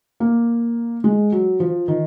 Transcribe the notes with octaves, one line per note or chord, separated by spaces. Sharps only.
A#3
G#3
F#3
F3
D#3